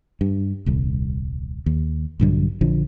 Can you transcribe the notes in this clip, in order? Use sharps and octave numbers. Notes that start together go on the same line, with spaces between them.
G2
D#1 C2
D#2
A#1 G2 D3 F#3
A#1 D3 F3